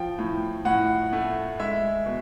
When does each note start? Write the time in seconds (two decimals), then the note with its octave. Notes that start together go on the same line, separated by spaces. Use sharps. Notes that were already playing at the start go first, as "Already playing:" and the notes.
Already playing: F3 G5
0.19 A2
0.65 A2 F#5
1.13 A3
1.60 G#3 E5
2.06 B2